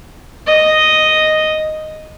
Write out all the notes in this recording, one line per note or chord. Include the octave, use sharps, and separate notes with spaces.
D#5